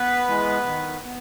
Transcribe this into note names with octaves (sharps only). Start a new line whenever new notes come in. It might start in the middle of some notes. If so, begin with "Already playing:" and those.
Already playing: B3 B4
E3 G#3
D#3
B3